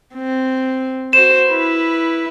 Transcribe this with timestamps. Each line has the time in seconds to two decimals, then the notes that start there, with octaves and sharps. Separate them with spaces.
0.15 C4
1.13 F#4 C5 E7
1.47 E4 B4